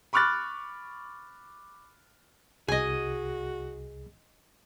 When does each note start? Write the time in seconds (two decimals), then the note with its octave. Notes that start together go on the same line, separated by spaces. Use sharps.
0.13 B5 C#6 D6 F6 F#6 A6
2.68 C2 F#4 G#4 D#5 G#5